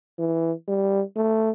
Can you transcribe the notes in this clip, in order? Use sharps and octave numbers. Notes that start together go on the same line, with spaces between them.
E3
G3
A3